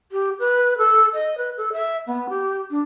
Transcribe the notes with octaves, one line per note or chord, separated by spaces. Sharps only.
G4
B4
A4
D#5
B4
A4
E5
B3
G4
D4